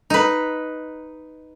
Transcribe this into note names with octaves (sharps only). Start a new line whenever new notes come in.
D#4 B4